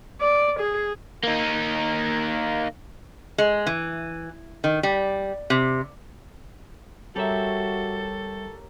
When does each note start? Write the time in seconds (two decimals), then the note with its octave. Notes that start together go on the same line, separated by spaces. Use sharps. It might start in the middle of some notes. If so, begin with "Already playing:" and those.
0.21 D5
0.60 G#4
1.24 A#3 D#4
3.38 G#3
3.67 E3
4.64 D#3
4.83 G3
5.50 C3
7.16 G3 F#4 G4 A4 A#4 C#5 E5